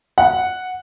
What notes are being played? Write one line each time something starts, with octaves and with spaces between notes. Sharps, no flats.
F#5